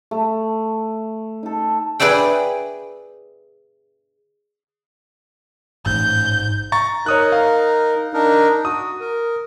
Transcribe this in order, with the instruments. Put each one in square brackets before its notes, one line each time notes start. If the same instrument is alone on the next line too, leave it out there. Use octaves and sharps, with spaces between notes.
[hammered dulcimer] A3
D#4 A4
[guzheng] G#4 B4 D5 E5 G5
[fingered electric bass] A1 [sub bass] G#2 [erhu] G6
[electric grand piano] A#5 C#6 A6
[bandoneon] D#4 A#4 [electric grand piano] C#5 D#6 F#6
[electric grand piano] F5
[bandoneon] D4 D#4 A#4
[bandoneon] F#4 [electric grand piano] D#6
[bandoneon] A#4